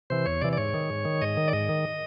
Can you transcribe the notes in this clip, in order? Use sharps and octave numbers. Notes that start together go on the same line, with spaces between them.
C3 E3 C5
E2 C#5
C3 E3 D5
D5
G#2 C#5
D#3
G#2
D#3
G#2 D#5
D#3
D5
G#2 D#5
D#3